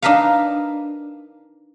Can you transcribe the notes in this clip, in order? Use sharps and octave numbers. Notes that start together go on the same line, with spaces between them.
D4 D#4 A#4 B4 F5